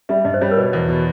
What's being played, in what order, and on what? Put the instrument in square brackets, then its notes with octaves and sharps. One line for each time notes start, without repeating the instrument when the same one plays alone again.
[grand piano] G3 [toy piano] E5
[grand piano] G2 [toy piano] D#5
[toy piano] C5
[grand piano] G3 [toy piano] C#5
[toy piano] A#4
[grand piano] B2 [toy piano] B4
[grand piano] E2
B2